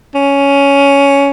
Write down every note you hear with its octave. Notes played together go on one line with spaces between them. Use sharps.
C#4